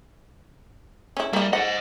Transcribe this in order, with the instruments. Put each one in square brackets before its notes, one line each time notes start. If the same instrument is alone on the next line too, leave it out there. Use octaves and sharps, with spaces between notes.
[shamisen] C#4 E4
[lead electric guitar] G3 [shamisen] A#3 E4
[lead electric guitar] C5 D#5 [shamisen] F#5